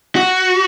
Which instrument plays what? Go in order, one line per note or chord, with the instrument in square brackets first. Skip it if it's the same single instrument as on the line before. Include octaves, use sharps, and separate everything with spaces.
[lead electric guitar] F#4